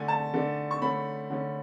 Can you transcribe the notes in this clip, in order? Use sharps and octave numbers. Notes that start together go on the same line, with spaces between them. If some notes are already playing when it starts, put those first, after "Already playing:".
Already playing: D3 A3 D4 G#5
A5
D3 A3 D4
C#6
D3 A3 C#4 B5
D3 A3 C#4